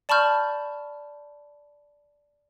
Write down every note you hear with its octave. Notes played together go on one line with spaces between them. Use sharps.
D5 A5 B5 C#6 F6 G6